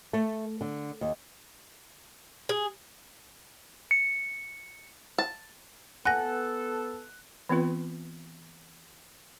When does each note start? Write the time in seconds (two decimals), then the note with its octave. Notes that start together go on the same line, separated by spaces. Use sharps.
0.13 A3
0.61 D3
1.01 D#2
2.49 G#4
3.91 C#7
5.18 A5
6.05 B3 A4 F#5 G#5 F#6 A#6
7.49 E3 B3 C4 F4 B4